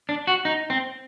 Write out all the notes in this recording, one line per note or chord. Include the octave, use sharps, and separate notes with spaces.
D4
F#4
D#4
C4